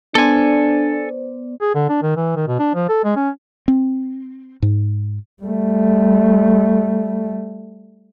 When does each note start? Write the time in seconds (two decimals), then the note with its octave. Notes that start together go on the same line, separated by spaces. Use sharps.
0.15 B3 D4 A4 C5 D5 G#5
1.61 G#4
1.75 D3
1.89 D4
2.03 D#3
2.17 E3
2.36 D#3
2.47 B2
2.59 D4
2.75 F3
2.89 A4
3.04 G#3
3.16 C#4
3.68 C4
4.62 G#2
5.43 G3 A3